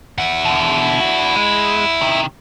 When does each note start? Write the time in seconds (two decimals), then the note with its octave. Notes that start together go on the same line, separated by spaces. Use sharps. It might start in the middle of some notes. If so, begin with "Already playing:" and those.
0.18 E4 F#5
0.45 B2 D3
1.00 D4 F#4
1.36 G#3
2.01 C3 D#3